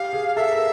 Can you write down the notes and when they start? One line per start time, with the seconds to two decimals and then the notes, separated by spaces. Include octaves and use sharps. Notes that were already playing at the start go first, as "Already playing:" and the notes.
Already playing: G4 F5
0.13 G#4
0.36 A4 E5
0.51 A#4